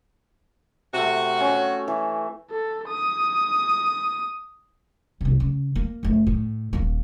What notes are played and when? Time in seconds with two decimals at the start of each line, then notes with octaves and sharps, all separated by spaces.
0.93 C3 A3 F#4
1.40 C#4
1.88 E3
2.51 A4
2.89 D#6
5.21 C2 C3
5.40 C#3
5.76 A#3
6.03 F#1 A3
6.27 A2
6.73 D#1 A#3